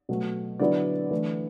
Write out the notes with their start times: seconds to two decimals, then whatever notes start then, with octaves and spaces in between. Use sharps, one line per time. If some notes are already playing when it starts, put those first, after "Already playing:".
0.09 B2 F#3 A3
0.59 D3 F#3 B3 E4 D5
1.11 E3 A3 D4